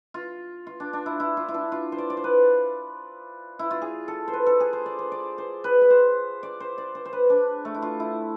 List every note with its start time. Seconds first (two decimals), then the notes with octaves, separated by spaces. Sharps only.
0.14 F4
0.67 F4
0.80 D4
0.93 D4
1.06 E4
1.20 E4
1.37 F4
1.48 E4
1.54 D4
1.72 F4
1.92 C5
1.98 D5
2.10 D5
2.17 C5
2.24 B4
3.59 E4
3.71 F4
3.82 G#4
4.08 A4
4.28 C5
4.33 B4
4.46 A4
4.60 G#4
4.73 C5
4.86 D5
4.99 C5
5.12 D5
5.38 C5
5.64 B4
5.82 B4
5.90 C5
6.43 D5
6.60 C5
6.78 D5
6.95 C5
7.05 C5
7.13 B4
7.30 D4
7.65 A3
7.74 E4
7.82 F4
8.00 E4